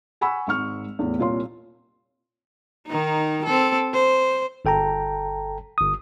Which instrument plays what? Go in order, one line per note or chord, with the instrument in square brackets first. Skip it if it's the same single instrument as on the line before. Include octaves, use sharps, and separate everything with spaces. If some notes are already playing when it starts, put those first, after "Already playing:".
[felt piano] F#5 G#5 B5 C#6 E6
G#1 G#2 C#6 F6
E2 A2 B3
C2 A#2 F4 C#5 C6
[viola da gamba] D#3 D#4
C4 A4
C5
[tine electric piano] G1 A4 G5 A5 A#5
G1 D#6